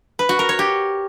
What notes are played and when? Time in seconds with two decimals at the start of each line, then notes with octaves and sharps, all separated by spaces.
0.19 B4
0.29 F#4
0.39 A#4
0.49 C#5
0.59 G4